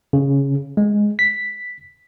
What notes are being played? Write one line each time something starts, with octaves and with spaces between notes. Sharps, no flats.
C#3
G#3
B6